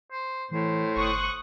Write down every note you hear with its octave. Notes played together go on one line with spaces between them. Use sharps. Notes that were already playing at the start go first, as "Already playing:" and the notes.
C5
A2 E3 C5
G1 C#6 D#6 F#6